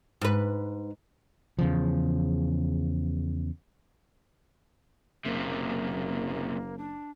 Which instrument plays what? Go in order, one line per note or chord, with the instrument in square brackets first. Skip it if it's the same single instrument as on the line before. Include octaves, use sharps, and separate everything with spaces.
[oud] G#2 B4
[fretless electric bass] E2 C#3 F3
[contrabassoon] F#1 [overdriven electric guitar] B1 C3 [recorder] A#3
[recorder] D4